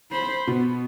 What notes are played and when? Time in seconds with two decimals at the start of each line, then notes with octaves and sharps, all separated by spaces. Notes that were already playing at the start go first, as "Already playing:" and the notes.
0.11 C5 B5
0.47 B2 B3